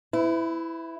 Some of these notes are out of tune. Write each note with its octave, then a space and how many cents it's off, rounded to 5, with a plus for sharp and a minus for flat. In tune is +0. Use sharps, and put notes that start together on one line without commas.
E4 +0 B4 +40